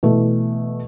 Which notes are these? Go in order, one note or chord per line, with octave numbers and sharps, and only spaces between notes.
B2 E3 A3